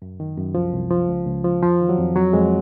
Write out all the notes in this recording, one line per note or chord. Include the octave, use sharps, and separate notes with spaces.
F#2
D#3
F#2
C2 F3
C2
F3
C#2
C#2
F3
F2 F3
D#3
F#3
F2
F2 F#3
F2 G#3